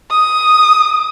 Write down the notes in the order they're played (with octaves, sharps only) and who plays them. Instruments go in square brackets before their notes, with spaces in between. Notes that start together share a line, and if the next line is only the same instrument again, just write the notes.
[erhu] D#6